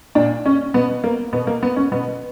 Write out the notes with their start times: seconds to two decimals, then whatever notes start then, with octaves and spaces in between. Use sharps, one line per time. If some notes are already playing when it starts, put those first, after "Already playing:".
0.15 A#2 D4
0.46 C#4
0.74 B2 B3
1.04 A#3
1.33 B2 B3
1.47 A#3
1.63 B3
1.76 C#4
1.92 B2 B3